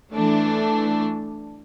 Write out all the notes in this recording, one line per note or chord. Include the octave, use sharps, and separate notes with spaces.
E3 A3 D4